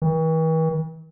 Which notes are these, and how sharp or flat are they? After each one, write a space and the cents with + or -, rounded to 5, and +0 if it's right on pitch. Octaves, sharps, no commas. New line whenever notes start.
E3 -45